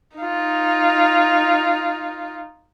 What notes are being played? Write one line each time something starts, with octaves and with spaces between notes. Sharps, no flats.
D#4 F4